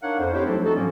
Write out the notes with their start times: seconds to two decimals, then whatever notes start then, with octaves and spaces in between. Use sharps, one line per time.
0.03 D4 D#4 A#4 C#5 F5 F#5
0.19 F2 C5
0.33 C4 D#4 E4 G4 C5 C#5
0.45 F3 F#3 A3 D4 E4 A4
0.64 C4 D4 D#4 F#4 A4
0.76 G#2 F3 F#3 A#3 C#4